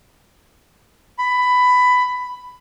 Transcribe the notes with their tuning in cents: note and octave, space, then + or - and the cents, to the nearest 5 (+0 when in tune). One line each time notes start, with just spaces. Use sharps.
B5 +15